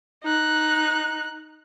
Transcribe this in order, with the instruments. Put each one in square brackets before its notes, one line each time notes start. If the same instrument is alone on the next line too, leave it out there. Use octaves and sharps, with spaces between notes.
[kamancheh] D#4 F#6